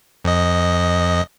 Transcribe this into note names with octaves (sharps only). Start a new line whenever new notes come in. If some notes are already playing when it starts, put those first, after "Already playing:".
F2 D#5